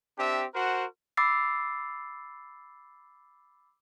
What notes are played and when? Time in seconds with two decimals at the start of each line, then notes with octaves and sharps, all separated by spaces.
0.18 C4 D4 G4 E5
0.55 F#4 A#4 C5 F#5
1.17 B5 D6 E6 A6 C7